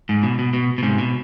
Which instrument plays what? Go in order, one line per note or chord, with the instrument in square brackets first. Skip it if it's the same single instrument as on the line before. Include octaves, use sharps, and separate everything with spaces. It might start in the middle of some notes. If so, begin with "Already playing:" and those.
[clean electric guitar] G#2
B2
B2
B2
B2
G#2 C3
B2